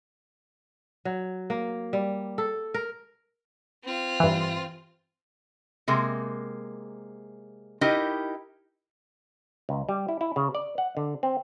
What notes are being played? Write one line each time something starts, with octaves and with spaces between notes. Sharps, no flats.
F#3
A#3
G3
A4
A#4
C4 F4
G2 E3
C3 G#3 A#3
D#4 E4 G4 A#4 D#5
C#2
G3
E4
E4
C#3
D5
F#5
D3
C4